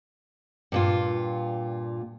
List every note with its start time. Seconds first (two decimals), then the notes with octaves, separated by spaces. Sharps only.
0.72 G2 A#2 F4